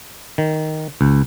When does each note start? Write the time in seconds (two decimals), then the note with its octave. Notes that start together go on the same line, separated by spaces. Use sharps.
0.38 D#3
1.01 C#2